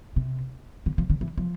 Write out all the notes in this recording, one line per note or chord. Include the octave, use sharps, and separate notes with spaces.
C3
D3
F3
D3
E3
F3